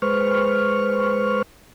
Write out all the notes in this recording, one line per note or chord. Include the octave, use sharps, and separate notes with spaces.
G#3 B4 C5 C#6 F6